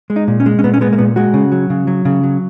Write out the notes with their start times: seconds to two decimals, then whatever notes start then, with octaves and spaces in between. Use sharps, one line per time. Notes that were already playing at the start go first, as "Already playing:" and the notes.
0.10 G#3
0.16 D#4
0.28 A#2
0.40 C#4
0.46 G#3
0.59 C#4
0.64 A#2 B3
0.74 C#4
0.81 G#3 B3
0.93 A#3
0.98 A#2 B3
1.16 G#3 F#4
1.34 C#3
1.52 F#3
1.70 C#3
1.87 F#3
2.05 C#3
2.23 F#3